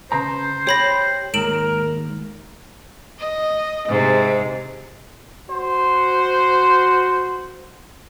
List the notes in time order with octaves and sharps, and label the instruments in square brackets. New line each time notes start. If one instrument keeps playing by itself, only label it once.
[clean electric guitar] C#3 B4 A#5 [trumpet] C5
[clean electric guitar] G4 [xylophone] C#5 B5 A#6
[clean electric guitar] D#2 G#2 [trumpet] A#4 [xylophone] D7 E7 F#7
[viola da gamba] D#5
G#2 C3
[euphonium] F#4 [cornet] C5